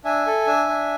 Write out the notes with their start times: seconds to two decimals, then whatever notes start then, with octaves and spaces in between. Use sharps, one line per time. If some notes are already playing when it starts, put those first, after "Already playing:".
0.04 D4 E5 G#5
0.27 A4
0.47 D4
0.69 D4